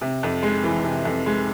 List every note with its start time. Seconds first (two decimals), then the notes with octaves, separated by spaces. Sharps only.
0.01 C3
0.23 F2
0.43 G#3
0.63 E3
0.84 C3
1.05 F2
1.26 G#3